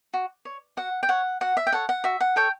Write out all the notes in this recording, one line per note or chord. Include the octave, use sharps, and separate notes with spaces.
F#4
C#5
F#4 F#5
G5
C#5 F#5
F#4 F#5
E5
G5
A4 C#5 F#5
F#5
F#4 E5
F#5
A4 C#5 G5